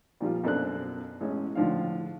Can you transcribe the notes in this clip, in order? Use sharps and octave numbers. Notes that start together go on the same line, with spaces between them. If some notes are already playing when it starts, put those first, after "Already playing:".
A#2 F3 G3 F4
F#2 B2 D4 A4 C5 F#6
A1 G#3 C#4
A2 D3 F3 D4 F5